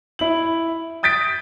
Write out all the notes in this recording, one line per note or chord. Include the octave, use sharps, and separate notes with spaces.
E4 F#7
D#6 G6 A6 B6 D7